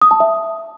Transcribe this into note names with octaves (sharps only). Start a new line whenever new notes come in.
D#6
A5
E5